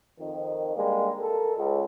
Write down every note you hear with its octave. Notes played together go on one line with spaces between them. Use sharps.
F2 D#3
D3 G3 G#3 A#3
A4 A#4
C#2